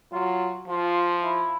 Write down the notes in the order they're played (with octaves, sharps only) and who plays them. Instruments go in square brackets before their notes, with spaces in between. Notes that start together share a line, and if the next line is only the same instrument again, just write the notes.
[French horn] F#3 [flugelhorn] F4
[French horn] F3 [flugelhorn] F4
[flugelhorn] E4